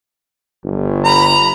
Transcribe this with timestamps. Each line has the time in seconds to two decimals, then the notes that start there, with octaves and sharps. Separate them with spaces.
0.64 G1
1.05 A#5 B5